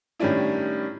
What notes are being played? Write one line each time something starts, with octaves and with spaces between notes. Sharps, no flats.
A2 D#3 G3 C#4 D4 E4